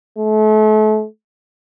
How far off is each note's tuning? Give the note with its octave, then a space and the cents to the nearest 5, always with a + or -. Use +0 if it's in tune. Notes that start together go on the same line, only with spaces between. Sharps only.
A3 -35